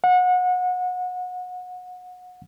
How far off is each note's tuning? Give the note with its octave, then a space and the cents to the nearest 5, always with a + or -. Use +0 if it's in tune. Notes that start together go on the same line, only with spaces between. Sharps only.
F#5 -30